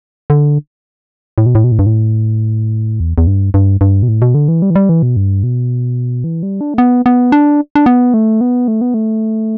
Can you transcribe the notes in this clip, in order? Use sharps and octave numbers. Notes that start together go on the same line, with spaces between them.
D3
A2
B2
A2
B2
A2
G2
A2
E2
E2
G2
G2
G2
B2
A2
B2
D3
E3
G3
E3
G3
E3
B2
G2
B2
E3
G3
D4
A3
B3
B3
D4
D4
B3
A3
B3
A3
B3
A3